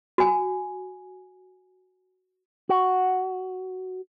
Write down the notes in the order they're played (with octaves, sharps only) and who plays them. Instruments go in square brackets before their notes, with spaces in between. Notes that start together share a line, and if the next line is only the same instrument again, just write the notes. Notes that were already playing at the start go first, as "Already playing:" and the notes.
[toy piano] F#4 G#5
[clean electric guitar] F#4